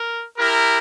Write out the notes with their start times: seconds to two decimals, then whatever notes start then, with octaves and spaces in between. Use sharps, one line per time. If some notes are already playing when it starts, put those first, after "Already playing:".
Already playing: A#4
0.38 E4 G4 A#4